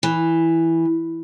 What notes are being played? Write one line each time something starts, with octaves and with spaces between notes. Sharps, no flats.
E3